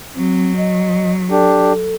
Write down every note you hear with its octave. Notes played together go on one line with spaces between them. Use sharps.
F#3 C4
D#5
D4 G4 A4